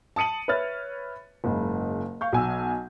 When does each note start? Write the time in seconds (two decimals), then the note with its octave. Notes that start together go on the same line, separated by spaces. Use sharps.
0.16 A5 D#6 C#7 D#7 F#7
0.48 B4 C#5 E5 F6 A6
1.44 F#1 G#2 C#3
2.21 F5 C#6 G6
2.33 B1 G#5 E6